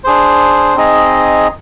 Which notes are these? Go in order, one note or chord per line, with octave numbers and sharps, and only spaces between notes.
D4 G#4 C5
C4 D#4 G#4 D#5